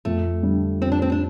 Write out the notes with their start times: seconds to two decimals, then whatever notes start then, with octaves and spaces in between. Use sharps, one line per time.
0.05 F2 A3
0.43 D3 G3
0.81 F2 C4
0.92 D4
1.02 C4
1.12 D4